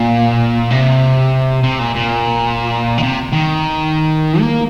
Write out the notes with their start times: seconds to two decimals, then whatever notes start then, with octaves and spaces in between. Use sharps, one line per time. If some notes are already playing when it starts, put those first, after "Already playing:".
Already playing: A#2
0.71 C3
1.63 C3
1.79 A#2
1.95 A#2
2.98 D#3
3.03 C3
3.33 D#3
4.41 A#3